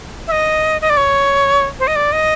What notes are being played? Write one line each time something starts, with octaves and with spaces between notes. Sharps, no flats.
E5
D#5
D#5
D5
C#5
C5
D#5
D5
D#5